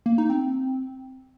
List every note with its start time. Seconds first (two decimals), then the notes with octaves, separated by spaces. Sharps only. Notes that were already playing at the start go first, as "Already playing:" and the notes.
0.06 A#3
0.18 D#4
0.30 C4